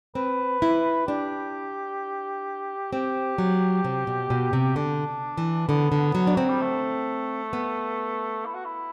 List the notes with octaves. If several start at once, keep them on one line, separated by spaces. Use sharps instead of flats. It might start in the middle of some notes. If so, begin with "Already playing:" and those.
C4 B4
E4
D4 G4
C4 G4
F#3
C3
B2
B2
C3
D3 D4
E3
D3 B3
D3
F#3
D4
F#3 C4
G3
A3
B3
E4
F#4
E4